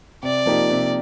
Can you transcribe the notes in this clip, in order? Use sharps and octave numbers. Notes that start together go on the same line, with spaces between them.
C3 D5
F3 A#3 D#4 G4
C3